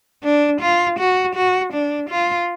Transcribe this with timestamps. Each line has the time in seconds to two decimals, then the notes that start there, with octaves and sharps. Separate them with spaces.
0.24 D4
0.61 F4
0.99 F#4
1.35 F#4
1.73 D4
2.10 F4